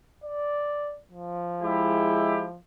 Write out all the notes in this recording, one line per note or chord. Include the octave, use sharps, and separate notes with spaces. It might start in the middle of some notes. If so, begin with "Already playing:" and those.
D5
F3
G#3 E4 G4